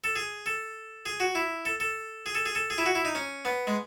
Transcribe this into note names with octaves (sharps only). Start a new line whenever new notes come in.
A4
G#4
A4
G#4
F#4
E4
A4
A4
G#4
A4
G#4
A4
G#4
E4
F#4
E4
D#4
C#4
B3
G#3